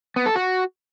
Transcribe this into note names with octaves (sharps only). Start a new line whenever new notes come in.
B3
A4
F#4